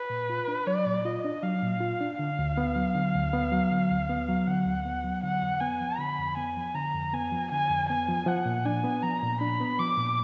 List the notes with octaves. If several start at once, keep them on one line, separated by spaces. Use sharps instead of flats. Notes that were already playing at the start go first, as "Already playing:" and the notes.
Already playing: B4
A#2
F4
D4
F#3 D5
A#2
F4 D#5
D4
F#3 F5
A#2
F4
D4
D3 F5
D2
B3
F#3
D3
D2
B3
F#3
D3
D2
B3
F#3
D3 F#5
D2
B3
F#3
D3 F#5
F2
B3 G#5
F3
D3 B5
F2
B3 G#5
F3
D3 A#5
F2
B3 G#5
F3
D3 G#5
F2
B3 G#5
F3
F3 F#5
A#2
D4 G#5
B3
F3 A#5
A#2
D4 B5
B3
F3 D6
A#2